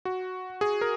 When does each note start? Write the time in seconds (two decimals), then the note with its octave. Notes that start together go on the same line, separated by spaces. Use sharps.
0.05 F#4
0.61 G#4
0.81 A#4